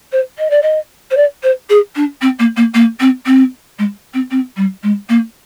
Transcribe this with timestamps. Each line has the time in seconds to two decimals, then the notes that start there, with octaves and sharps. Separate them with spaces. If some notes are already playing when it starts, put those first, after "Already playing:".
0.12 C5
0.38 D#5
0.50 D5
0.62 D#5
1.10 C5
1.16 D5
1.43 C5
1.69 G#4
1.95 D4
2.21 C4
2.39 A#3
2.56 A#3
2.74 A#3
3.00 C4
3.26 C4
3.78 G#3
4.13 C4
4.30 C4
4.56 G3
4.83 G#3
5.09 A#3